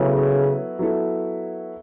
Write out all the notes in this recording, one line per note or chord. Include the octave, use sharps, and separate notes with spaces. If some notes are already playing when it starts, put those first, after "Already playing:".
Already playing: C#3 F#3 B3 E4 A4
F#3 B3 E4 A4